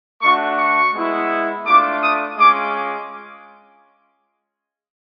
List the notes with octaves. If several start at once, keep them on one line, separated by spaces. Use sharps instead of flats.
A3 D4 F#4 C#6
C#6
G#3 B3 E4
A3 D4 F4 D6
D#6
G#3 C#4 F4 D6